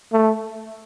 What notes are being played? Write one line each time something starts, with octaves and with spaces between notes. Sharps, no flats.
A3